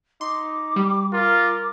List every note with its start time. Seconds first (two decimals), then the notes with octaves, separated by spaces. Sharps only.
0.21 D#4 C6 D6
0.76 G3 G4
1.13 F4 A#4 D6